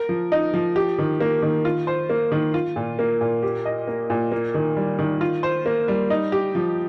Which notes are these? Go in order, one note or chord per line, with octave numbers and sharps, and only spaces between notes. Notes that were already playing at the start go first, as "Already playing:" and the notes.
Already playing: A#4
F3
D#4
F3
G4
D#3
A#3
D#3
F4
C5
A#3
D#3
F4
A#2
A#3
A#2
G4
D#5
A#3
A#2
A#3
D#3
G3
D#3
F4
C5
A#3
G3
D#4
G4
F3